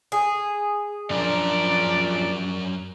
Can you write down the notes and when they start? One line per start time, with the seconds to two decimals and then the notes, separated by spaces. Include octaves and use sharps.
0.12 G#4
1.11 F#2 F3 D4 A#4 D5